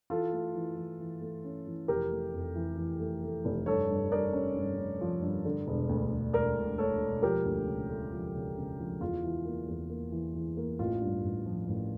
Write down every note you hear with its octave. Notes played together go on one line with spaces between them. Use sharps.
E3 F4 A4
A3
E3
E3
E3
A3
C#4
E3
F1 G4 A#4
A3
F2
E3
E3
A3
A3
F1
G2 A4 C#5
G2
G2 A#4 D5
C#4
G2
C#4
F3
G2
D3
E1
D2
E1
E1 A#4 D5
E1
A3 A4 C#5
E1
F3 G4 A#4
D2
C#3
A3
F3
C#3
C#3
F3
E2 F4
E3
A#3
E2
A#3
E3
E3
A#3
A1 F4
G2
A1
F3
A1